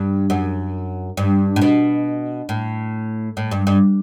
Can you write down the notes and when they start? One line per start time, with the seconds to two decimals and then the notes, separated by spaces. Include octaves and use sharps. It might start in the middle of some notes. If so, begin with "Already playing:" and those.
Already playing: G2
0.30 F#2
1.17 G2
1.56 A2
1.62 B2
2.49 A2
3.37 A2
3.51 G2
3.67 G2